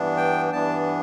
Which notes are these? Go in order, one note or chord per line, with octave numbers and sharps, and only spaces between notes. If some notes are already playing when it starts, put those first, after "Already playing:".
Already playing: G2 E3 B3 D4
G5
G2 E3 B3 D4 A5